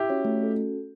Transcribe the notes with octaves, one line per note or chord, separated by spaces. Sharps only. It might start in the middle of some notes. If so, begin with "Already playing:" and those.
Already playing: E4 G4
C#4 F#4 C#5
A3
C#4 F#4 A4